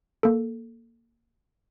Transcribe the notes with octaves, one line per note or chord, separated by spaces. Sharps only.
A#3 A4